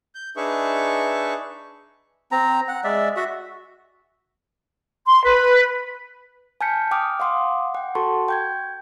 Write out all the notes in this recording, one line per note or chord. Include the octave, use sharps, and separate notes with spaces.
G6
D4 D#4 G#4 B4 E5 C#6
C4 A#5
F#5
G#3 D5 E5
F#4 E5 F#5
C6
B4
G#5 A5 F6 G6 B6 C#7
G5 D6 D#6 F6
F5 F#5 C6 D6 D#6
F#5 G5
F#4 A4 A5 C6 C#6
G5 G6 G#6